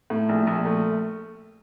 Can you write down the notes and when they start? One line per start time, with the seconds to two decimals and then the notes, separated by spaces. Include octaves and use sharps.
0.10 A2
0.29 A#1
0.47 A#1
0.65 A3